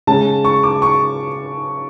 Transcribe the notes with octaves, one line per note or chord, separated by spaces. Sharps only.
C#3 G#3 C#4 A5
C#6
D6
C#6